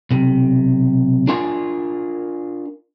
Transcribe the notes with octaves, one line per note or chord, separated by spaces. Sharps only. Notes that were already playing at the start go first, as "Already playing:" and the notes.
B1 C3
D4 F4 A#4 G#5 C6